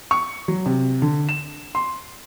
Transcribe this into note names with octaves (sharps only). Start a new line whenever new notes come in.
C#6
F#3
C3
D3
E7
C6